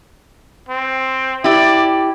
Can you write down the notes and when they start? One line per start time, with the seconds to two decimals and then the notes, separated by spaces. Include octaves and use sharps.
0.69 C4
1.44 E4 G4 D5